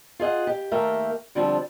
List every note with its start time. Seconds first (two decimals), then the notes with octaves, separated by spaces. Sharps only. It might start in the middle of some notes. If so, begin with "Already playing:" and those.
0.19 F4 G#4 D#5 F#5
0.47 G4
0.71 D#2 A3 A#3 A#4 E5 G5
1.35 D3 F3 G3 C4 D4